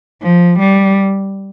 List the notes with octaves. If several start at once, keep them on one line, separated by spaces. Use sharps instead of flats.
F3
G3